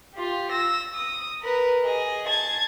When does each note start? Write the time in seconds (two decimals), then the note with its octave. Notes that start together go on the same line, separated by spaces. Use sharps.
0.14 F4 G4
0.51 E6 A#6
0.94 D#6
1.41 A#4 B4
1.84 G#4 D#5
2.27 A5 G#6